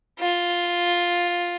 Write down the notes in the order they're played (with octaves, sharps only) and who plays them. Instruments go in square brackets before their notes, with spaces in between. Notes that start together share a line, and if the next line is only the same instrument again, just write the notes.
[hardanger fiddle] F4